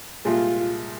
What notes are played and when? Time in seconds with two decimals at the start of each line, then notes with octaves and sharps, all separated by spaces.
0.25 C2 A#2 G#3 F4